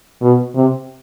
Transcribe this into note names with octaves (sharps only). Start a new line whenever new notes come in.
B2
C3